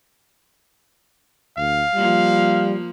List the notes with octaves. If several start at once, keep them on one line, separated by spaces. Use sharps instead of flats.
D2 F5
F3 G3 A#3 F4